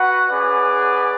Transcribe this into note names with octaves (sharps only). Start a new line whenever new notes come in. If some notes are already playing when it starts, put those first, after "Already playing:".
Already playing: F#4 B4 F#5
C#4 G#4 B4 D5 F#5